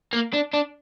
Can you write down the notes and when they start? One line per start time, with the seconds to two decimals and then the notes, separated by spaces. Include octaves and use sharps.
0.13 A#3
0.34 D4
0.54 D4